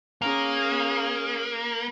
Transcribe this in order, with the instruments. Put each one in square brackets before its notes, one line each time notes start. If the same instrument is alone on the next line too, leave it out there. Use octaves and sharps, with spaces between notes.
[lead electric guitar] A#3 [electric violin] C#4 G#4